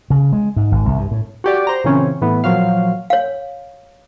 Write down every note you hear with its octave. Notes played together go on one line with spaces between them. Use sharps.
C#3
G#3
G#2
G#1
C2
G2
A2
F#4 G4 D5
C5 A#5
A#2 C#3 E3 C4 C#4
A2 E3 B3
A#2 F3 F#3 F5
C#5 F5